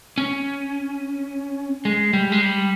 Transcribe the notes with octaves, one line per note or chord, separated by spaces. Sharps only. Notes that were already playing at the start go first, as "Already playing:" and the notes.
C#4
G#3
G3
G#3
G3